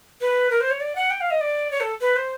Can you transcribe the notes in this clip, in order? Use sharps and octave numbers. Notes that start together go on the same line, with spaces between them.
B4
A#4
C5
C#5
D5
F#5
G5
F5
D#5
D5
C#5
A4
B4
C5